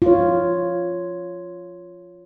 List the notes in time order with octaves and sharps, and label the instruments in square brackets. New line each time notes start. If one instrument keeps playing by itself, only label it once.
[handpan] F4 C#5